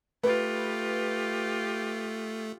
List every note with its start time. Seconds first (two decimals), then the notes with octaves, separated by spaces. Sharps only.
0.23 A3 F4 G4 B4